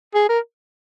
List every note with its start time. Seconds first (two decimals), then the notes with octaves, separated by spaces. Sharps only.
0.15 G#4
0.29 A#4